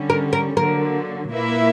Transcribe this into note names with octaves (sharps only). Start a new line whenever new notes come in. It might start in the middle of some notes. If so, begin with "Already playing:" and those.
Already playing: D3 G3 C#4
A#4
A#4
D3 F#3 A#3 A#4
A#2 A#3 E4 B4 E5